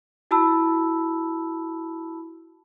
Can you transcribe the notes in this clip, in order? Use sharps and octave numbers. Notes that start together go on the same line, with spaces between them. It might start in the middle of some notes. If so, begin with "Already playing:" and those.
E4 F#4 A5 B5 E6